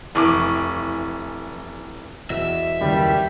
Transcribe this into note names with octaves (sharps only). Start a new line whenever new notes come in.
F1 E3 C#6 D6
E2 B2 E5 E6 A#6
F#1 D#2 G3